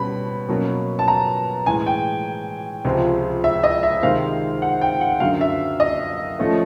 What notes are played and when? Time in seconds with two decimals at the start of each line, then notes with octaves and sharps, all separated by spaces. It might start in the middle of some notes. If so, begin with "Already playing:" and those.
Already playing: B2 G3 C#4 B5
0.48 B2 F#3 A#3 C#4
0.99 A5
1.08 A#5
1.66 A2 E3 G#3 G#5
1.86 G5
2.85 C#2 C3 F3 G#3
3.44 E5
3.63 D#5
3.83 E5
4.02 C3 D#3 G#3 C4 F5
4.62 F#5
4.81 G5
5.01 F#5
5.20 F#2 D3 F#3 F5
5.41 E5
5.80 D#5
6.39 F3 A3 C#4